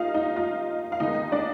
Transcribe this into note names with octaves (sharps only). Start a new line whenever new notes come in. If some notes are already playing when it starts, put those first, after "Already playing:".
Already playing: D#2 G3 D#4 F4 D#5 F5
D#4 D#5
F4 F5
F5
D#2 D#3 G#3 B3 D#4 D#5
D4 D5